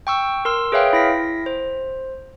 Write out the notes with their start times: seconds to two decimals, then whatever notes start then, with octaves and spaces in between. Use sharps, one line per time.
0.07 G5 C#6 E6
0.45 A#4 C6 E6
0.72 G#4 B4 C#5 E5 F5 G5
0.93 E4 A#6 B6
1.46 C5